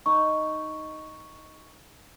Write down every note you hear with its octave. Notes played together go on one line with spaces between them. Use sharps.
D#4 C#6